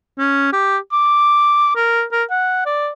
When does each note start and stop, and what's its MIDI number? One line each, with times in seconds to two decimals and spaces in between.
0.18 0.52 61
0.53 0.77 67
0.92 1.71 86
1.76 2.03 70
2.12 2.23 70
2.30 2.62 78
2.66 2.90 74